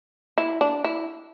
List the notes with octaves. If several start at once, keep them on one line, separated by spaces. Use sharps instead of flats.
E4
D4
E4